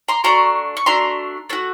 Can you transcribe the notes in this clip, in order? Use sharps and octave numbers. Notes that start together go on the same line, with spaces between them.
A#5 C6
A3 D4 F#4 A#5 C6
C#6
A3 D4 F#4 A#5 C6
A3 D4 F#4